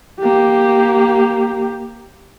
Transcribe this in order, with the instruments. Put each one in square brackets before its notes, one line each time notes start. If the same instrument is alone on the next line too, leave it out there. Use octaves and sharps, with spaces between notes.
[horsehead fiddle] A#3 G4